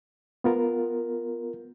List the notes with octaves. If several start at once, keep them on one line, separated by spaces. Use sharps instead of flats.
B3 F4 A#4